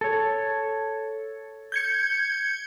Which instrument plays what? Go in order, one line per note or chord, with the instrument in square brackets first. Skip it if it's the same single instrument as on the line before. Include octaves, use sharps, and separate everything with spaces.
[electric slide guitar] A4 C#5
[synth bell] G6 G#6 C#7